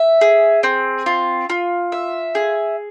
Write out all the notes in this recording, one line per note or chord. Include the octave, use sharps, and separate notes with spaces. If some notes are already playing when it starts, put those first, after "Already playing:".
Already playing: E5
G#4
C4
F4
F4
E5
G#4